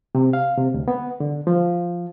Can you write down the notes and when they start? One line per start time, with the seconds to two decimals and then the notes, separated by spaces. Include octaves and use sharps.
0.15 C3
0.33 F5
0.58 C3
0.74 D2
0.88 B3
1.20 D3
1.47 F3